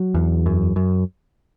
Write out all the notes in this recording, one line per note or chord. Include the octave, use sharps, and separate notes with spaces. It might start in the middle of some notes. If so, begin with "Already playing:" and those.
Already playing: F#3
E2
F#2
F#2